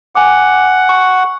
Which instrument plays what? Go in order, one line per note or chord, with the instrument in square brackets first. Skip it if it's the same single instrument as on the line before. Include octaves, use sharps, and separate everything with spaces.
[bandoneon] F#5 [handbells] G#5 D6
[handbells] C#6